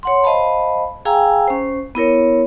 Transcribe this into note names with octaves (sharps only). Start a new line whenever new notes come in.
C#5 F#5 C6
C5 D#5 F5 A5 B5
G#4 F5 G5 G#5 A#5 E6
C#4 C5
B3 E4 A#4 C#5